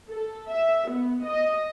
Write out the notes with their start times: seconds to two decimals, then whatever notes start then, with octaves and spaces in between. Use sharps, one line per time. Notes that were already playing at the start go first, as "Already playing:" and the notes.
0.11 A4
0.49 E5
0.89 B3
1.26 D#5